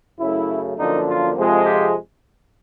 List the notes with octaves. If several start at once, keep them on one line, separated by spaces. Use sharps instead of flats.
F#2 C#3 F#3 A3 E4
F#2 D3 F3 A#3 D#4
F4
F2 C3 F3 G#3
G4